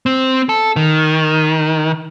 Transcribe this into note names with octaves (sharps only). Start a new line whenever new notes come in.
C4
A4
D#3